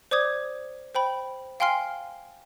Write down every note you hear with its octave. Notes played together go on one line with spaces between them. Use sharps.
C5 D5 D6 D#6 G#6
C5 G5 B5
F5 G5 G#5 C6 F6 C7